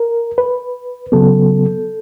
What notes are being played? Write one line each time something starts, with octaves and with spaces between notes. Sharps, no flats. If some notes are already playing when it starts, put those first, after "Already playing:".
Already playing: A#4
B4
C#3 F#3 B3 A4